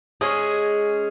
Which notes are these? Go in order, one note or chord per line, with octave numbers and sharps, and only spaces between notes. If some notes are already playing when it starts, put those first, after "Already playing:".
G#3 C#4 G#4